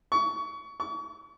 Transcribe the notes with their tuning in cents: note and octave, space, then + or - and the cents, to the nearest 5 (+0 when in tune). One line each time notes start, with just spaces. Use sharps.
C#6 +25
C#6 +40